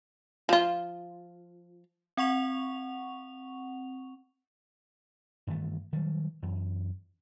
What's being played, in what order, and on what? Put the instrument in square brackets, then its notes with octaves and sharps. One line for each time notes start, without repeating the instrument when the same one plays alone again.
[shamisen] F3 F4
[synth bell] C4 F#5 C#6 F7
[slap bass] G2 D#3 E3 A3
D#3 F#3 G3
F#2 E3